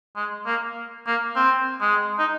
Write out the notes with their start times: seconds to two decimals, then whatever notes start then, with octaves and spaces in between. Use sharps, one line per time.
0.16 G#3
0.46 A#3
1.07 A#3
1.36 C4
1.81 G#3
2.19 D#4